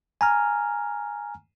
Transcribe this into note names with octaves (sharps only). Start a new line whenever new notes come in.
G#5 A#5 F6